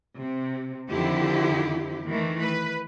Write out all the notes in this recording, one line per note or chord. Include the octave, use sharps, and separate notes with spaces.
C3
F2 D3 D#3 F3 E4 G4
D#3 E3 A3
B4